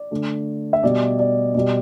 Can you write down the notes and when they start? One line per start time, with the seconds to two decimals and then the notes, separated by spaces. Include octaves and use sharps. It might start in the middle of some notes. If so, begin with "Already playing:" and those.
Already playing: D5
0.11 D3 A3
0.73 E5
0.83 B2 G3 D5
1.19 D5
1.55 B2 G3